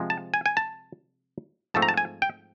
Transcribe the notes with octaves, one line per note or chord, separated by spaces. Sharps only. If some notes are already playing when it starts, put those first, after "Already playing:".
Already playing: C3 F3 G#3
A5
G#5
G#5
A5
G#2 F3 A3 C4 A5
A#5
A5
G#5
G5